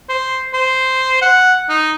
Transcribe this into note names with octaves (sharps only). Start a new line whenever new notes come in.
C5
C5
F#5
D#4